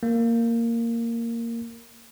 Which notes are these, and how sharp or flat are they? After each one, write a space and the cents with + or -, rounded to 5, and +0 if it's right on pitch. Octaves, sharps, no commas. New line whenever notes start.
A#3 -10